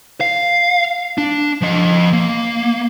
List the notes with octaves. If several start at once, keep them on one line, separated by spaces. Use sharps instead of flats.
F5
D4
F3 D#5
A#3